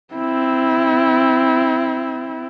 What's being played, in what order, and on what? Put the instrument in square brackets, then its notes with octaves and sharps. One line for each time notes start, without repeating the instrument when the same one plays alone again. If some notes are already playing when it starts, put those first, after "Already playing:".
[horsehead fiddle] C4 E4